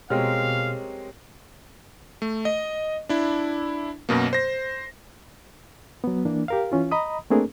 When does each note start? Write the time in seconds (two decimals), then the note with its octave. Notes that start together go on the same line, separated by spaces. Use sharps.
0.10 B2 G#3 C4 G4 A#4 C#5 F5 F6
2.22 A3
2.45 D#5
3.09 D4 E4
4.09 F#2 B2 A#3
4.33 C5 A#6
6.04 F#3 B3
6.25 E3 A#3 D4
6.48 G4 A#4 F5
6.72 E3 C#4 F4
6.91 D#5 A#5 B5 D#6
7.30 A3 A#3 C4 D4 G#4 A#4